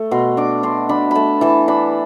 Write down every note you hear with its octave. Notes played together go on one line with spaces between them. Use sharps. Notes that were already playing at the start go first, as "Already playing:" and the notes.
Already playing: A3
B2 C6
D4 D6
D4 C6
D4 B5
A3 A5 B5
E3 A5
D4 B5